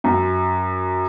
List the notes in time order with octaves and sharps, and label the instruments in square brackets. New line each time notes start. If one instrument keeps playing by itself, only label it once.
[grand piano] F#2